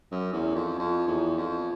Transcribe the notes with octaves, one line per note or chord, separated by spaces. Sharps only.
F#2
E2
F2
F2
E2
F2